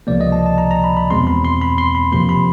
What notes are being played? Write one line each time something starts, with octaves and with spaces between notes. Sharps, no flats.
C#2 C3 F3 A#3 D5
D#5
A5
A5
A#5
A#5
B5
B5
E2 B2 G#3 C4 C6
B5
C6
B5
C6
B5
F2 C3 F3 A#3 C6
B5